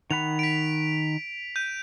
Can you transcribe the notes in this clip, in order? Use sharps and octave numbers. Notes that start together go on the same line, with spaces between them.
D#3 F#5 B5 F7
B6 D7
G6 D#7